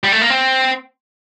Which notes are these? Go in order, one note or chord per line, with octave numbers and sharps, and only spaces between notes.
G3
A3
A#3
C4